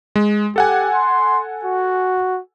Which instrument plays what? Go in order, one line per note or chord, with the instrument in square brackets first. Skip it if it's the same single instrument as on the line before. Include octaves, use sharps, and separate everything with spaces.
[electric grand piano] G#3
[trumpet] G4 [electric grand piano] A4 F#5 G#5
[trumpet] C6
F#4